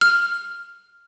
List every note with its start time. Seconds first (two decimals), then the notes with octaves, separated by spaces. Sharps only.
0.01 F6